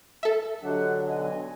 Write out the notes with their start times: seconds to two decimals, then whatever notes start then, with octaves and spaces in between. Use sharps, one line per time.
0.23 A4 E5
0.63 D3 F#3 D4 G4 D#5 F#5
1.07 B1 D#5 G#5